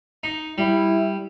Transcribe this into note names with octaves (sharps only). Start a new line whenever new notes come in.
D#4
G3 E4